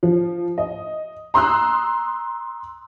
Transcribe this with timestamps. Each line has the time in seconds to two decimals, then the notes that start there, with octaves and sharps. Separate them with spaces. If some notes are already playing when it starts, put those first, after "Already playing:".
0.03 F3
0.58 D#5
1.34 A#5 C6 D#6 E6 F#6